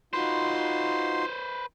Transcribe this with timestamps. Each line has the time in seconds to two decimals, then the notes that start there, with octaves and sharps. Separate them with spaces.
0.13 D#4 F4 F#4 B4 C5 C6